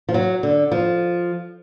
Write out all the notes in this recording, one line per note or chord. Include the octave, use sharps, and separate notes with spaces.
F3
F#3
D3
F3